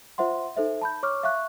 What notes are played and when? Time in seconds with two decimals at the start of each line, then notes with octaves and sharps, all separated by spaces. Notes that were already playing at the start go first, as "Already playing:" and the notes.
0.18 F4 C5 E5 F#5 C6
0.57 D#4 A4 C5 E5
0.81 A5 B5 G6
1.03 C#5 C#6 D6 F6
1.23 E5 F5 C#6 F#6